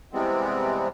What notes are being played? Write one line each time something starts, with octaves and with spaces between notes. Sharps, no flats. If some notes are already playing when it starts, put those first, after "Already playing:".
C3 E3 G3 G#3 B3 C4